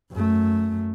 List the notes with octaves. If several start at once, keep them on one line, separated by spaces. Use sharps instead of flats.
F#2 A3